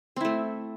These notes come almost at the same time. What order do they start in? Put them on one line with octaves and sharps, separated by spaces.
C4 E4 A3